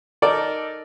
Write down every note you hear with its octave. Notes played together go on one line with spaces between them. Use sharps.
D#4 A4 A#4 D5